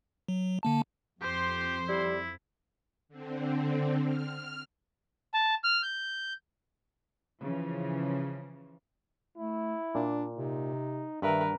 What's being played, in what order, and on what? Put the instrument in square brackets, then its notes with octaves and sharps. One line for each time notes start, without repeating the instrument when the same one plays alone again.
[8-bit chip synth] F#3
D3 A#3 A5
[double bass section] F2 [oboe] G4 [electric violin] C5 C6
[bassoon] G3 [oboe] E4
[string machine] D3 C4
F6
[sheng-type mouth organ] A5
F6
G6
[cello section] C#3 E3 F3
[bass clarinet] A3 [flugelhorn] E4
[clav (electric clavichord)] A#2 [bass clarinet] D4
[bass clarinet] C3 [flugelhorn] D#4
[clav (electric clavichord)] G2 [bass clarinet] D#3 [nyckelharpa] A#4 B4 [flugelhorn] E5